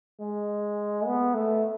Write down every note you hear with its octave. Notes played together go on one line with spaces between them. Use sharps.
G#3
B3
A3